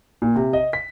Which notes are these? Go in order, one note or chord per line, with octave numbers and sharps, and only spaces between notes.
A#2
C3
D#5
B6